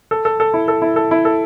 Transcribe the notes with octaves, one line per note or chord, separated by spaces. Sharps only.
A4
A4
A4
E4
A4
E4
A4
E4
A4